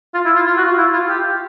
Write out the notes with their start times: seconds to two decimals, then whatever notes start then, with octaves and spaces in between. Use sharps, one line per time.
0.14 F4
0.25 E4
0.36 F4
0.47 F4
0.57 F#4
0.67 F4
0.78 E4
0.93 F4
1.09 G4